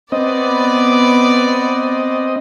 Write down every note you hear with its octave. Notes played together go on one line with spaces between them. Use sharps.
B3 C4 D5 D#5